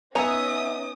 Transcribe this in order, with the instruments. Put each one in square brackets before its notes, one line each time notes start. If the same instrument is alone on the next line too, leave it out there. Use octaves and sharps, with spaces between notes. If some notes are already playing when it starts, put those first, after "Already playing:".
[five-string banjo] B3 A#5 [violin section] C#4 D#4 D#6 [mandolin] E5 F#5 G#5